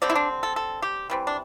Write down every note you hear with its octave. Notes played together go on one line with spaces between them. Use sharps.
D3 G3 C4 D5
E4
D4
A4
A4
G4
E3 G3 C4
D4